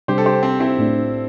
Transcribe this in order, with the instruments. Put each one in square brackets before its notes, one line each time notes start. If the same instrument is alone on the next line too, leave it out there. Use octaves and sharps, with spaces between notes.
[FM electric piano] C3 G3 D4 [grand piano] G4 C5
[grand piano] A4
G4 C5
C4
C4 E4
[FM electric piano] A2 A3 D4